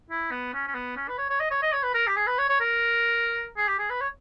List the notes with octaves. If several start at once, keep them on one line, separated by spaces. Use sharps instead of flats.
E4
B3
C#4
C#4
B3
C#4
B4
C#5
C#5
D#5
C#5
D#5
C#5
B4
A#4
G4
G#4
B4
C#5
C#5
A#4
G#4
G4
G#4
B4
C#5